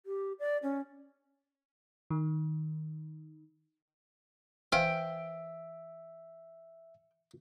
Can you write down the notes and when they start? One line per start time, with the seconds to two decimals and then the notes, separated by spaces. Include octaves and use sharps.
0.06 G4
0.39 D5
0.63 C#4
2.10 D#3
4.72 E3 C5 E5 F5 G5 G#5